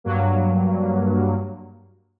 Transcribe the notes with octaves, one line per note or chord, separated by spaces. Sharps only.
G2 F#3 A#3